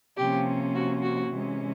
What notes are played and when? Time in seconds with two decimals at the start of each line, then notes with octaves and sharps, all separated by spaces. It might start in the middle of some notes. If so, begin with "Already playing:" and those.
0.17 C3 F3 A#3 C#4 G4
0.75 F#4
1.02 F#4
1.31 C3 E3 G#3 C#4